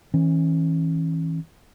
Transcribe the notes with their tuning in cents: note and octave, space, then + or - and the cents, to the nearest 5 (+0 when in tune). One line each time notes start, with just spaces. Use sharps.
E3 -30 C#4 -20